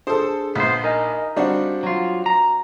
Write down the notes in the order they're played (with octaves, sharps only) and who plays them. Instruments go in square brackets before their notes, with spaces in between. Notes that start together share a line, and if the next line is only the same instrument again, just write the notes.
[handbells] D4 G#4 [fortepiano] A4 C5
[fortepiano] A#1 [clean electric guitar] B3 C5
[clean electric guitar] D#4 [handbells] A#4 D#5 G#5
[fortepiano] G3 C4 D4 [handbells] F#4 F5 F#5
[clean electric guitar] F#3 F4
A#5